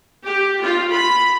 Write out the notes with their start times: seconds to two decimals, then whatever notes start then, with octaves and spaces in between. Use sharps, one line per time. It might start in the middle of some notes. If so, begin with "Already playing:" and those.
0.24 G4
0.62 F4
0.93 B5